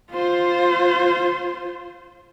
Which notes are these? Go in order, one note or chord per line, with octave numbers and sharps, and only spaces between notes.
F4 C5